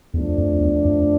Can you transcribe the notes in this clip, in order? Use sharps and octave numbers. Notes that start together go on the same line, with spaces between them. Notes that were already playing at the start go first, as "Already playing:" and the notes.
E2 F3 A3 D4
F2
E2
F2